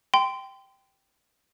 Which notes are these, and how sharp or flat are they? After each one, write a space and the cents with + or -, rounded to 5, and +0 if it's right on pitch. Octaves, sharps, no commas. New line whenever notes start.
G5 +0 C6 -25